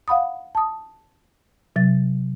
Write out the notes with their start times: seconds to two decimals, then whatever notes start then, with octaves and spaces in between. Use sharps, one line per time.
0.08 F5 F#5 B5 D#6
0.55 A5 D#6
1.76 C3 F#3 A6